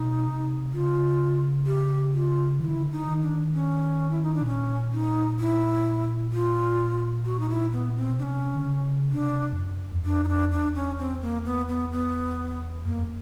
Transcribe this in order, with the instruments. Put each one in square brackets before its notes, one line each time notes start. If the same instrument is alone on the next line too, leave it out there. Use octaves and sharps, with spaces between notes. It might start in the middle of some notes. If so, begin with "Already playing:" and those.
Already playing: [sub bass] B2 [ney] D#4
[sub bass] C3
[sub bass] C#3 [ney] F4
[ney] G4
F4
[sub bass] D#3 [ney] F4
[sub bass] D3 [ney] E4
[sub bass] C#3
D3
[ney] D#4
[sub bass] D#3
[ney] D4
C#4
E4
D#4
D4
[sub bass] B2
[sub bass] A#2 [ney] C#4
[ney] D#4
E4
F4
F#4
D#4
E4
B3
C4
[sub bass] B2
[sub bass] C3 [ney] D4
[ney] C#4
[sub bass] D3
C#3
[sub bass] C3 [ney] D4
[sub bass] F2
F#2
E2
[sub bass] F2 [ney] D4
[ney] D#4
D4
[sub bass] E2 [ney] D4
[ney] C#4
C4
A#3
B3
B3
B3
[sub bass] F#2 [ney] A#3
[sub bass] F2